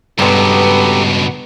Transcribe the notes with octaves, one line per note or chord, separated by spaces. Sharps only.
C#2 G2 B2 B3 G4 A4 A#5 C6